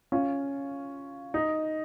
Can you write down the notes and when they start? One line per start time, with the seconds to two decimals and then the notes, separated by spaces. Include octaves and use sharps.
0.12 C#4 F4
1.34 D#4